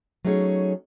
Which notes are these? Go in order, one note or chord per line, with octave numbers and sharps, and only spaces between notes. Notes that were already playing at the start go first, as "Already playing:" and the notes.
F#3 A3 C#4 D#4 G#4 C#5